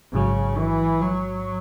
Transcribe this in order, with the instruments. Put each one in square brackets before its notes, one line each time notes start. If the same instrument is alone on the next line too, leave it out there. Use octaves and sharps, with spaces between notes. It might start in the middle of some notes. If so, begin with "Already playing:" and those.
[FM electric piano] A1 G#2 F#3 [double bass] C#3
[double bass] E3
F#3